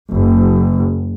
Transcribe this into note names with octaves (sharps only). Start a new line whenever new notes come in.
F#1